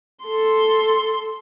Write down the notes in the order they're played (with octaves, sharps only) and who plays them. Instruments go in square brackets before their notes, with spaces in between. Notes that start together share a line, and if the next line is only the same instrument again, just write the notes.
[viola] A4 C6